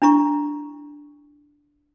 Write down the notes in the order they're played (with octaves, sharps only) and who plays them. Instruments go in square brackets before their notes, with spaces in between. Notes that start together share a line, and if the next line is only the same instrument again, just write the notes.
[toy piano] D4 E4 A#5 C#6